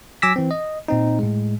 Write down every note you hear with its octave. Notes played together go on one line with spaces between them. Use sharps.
F#3 G#5 D6 E6 A#6 B6
E3 C4
D#5
A#2 C4 D#4
A2 G#3